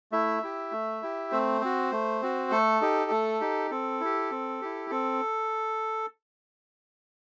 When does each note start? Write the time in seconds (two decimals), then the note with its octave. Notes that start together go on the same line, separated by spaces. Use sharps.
0.12 A3 E4 E5
0.43 E4 G4
0.72 A3
1.02 E4 G4
1.32 A3 C4 C5
1.61 C4 F#4
1.92 A3
2.22 C4 F#4
2.51 A3 A4
2.81 D#4 G4
3.11 A3
3.41 D#4 G4
3.71 C4 A4
4.01 E4 G4
4.31 C4
4.61 E4 G4
4.90 C4 A4